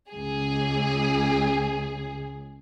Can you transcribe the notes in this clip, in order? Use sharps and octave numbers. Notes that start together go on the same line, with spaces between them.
C#2 G#4